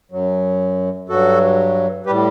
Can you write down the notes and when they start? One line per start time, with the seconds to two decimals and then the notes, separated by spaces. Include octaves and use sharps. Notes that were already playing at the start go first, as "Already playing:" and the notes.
0.12 F#2 F#3
1.08 G2 F#3 F#4 A4
2.06 A2 G3 G4 B4